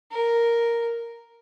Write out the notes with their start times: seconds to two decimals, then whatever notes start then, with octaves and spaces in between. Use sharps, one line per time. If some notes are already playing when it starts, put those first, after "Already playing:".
0.12 A#4